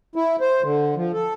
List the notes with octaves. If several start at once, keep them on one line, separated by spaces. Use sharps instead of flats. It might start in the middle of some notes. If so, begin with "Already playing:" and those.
E4
C5
D3
F3
A4